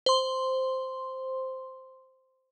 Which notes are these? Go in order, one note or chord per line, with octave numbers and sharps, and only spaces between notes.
C5 C6